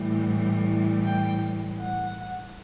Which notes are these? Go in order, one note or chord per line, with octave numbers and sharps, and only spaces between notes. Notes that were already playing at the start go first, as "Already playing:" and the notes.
Already playing: A2 E3 G3
G5
F#5